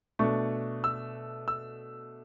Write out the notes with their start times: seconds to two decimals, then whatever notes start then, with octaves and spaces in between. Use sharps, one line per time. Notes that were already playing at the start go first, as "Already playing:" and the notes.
0.19 B2 A3 D4 C#6
0.84 E6
1.48 E6